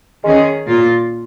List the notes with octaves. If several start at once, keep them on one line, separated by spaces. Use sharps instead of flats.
D#3 G#3 C#4 G#4
A#2 A#3 F4